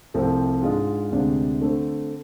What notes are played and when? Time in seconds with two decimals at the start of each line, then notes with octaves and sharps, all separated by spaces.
0.14 C2 C3 F3 A3 C4
0.62 G#2 G#3 D4 F4
1.11 D2 C3 G#3 D4
1.60 D3 A3 C4